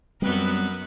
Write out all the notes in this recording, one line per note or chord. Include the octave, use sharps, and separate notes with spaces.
F#2 G3 B3 C4 B4